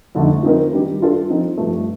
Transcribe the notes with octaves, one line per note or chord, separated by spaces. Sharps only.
F2 D3 A3 D#4
F3 C4 D#4 A#4
D#3 G3 D4 G4
G3 D4 F4 A4
F3 C4 D#4
G2 F3 A3